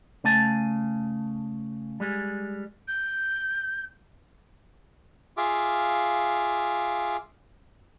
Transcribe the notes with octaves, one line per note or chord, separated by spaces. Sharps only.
C#3 A3 G#5 A5
G3 G#3
G6
F4 G#4 E5 F5 D6